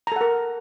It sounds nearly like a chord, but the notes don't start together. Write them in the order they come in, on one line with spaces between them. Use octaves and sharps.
A#5 A4 F#5 A#4